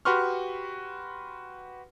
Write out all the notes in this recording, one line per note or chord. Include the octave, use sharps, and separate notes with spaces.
F#4 G4 B4 C6 C#6 F6